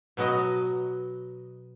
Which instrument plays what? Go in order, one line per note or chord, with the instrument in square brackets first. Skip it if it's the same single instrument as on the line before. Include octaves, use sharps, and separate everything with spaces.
[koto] B2 F#3 B3 F#4 D#5